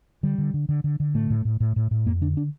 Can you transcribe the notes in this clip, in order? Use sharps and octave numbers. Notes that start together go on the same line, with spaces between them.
D3 G3
D3
D3
D3
D3
D3
A2 A3
A2
A2
A2
A2
A2
F2 A#3
D3 D4
D4